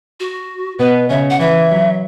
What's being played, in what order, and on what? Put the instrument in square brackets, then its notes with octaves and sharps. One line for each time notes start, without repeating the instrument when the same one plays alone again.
[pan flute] F#4
[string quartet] B2 B3 [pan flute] B4
[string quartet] C#3 C#4 [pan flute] E5
[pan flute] F#5
[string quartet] E3 [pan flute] E5
[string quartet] F#3